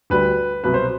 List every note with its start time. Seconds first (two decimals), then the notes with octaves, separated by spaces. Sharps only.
0.10 D2 D3 G3 B4
0.64 C2 B2 F#3 B4
0.74 C5